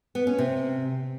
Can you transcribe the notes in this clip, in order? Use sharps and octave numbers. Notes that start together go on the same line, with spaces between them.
B3
C#4
C3